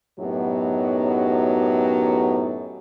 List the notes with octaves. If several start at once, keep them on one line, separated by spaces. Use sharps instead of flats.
F#2 A2 F#3 B3 D#4 G4